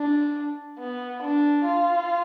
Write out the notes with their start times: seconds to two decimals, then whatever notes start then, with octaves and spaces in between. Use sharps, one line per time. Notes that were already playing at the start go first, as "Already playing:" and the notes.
Already playing: D4
0.79 B3
1.22 D4
1.65 F4